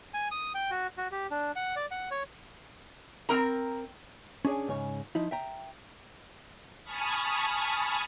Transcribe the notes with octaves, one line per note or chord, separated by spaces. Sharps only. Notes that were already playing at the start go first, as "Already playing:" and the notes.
G#5
D#6
G5
F#4
F#4
G4
D4
F#5
D5
F#5
C#5
C4 A#4 A#5
C#4 D4 G#4 C#5 D5
G#2 C#3 C#5
F3 D#4 E4
E5 G5 A#5
G#5 A5 B5 C#6 D#6 F6